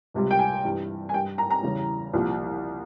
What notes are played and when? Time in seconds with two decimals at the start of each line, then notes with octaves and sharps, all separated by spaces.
0.14 C#2 C3 G3
0.31 G5
0.39 G#5
0.65 G2 E3 G3
1.09 G#5
1.14 G2 G3 G5
1.38 A#5
1.50 A#5
1.63 E2 C#3 E3 G3
2.13 C2 A#2 F3